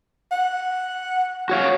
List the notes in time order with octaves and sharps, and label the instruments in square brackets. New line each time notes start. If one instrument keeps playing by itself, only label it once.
[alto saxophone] F#5
[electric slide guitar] F#4 C#5 F5